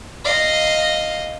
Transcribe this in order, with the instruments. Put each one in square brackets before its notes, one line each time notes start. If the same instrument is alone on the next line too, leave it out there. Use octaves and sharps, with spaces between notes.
[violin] D#5 F5